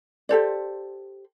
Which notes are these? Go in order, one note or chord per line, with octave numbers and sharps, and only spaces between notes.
G4 A4 C5 D5